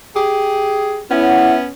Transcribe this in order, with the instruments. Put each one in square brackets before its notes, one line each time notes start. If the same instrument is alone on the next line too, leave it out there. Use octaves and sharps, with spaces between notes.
[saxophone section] G4 G#4
[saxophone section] B3 C#4 [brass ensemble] E4 F#5